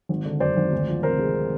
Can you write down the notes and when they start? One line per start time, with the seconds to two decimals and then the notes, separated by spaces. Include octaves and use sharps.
0.09 G#1
0.25 D3
0.40 F#2 C5 D5
0.57 G#1
0.72 D2
0.88 F3
1.03 C3 A#4 C5
1.19 G#3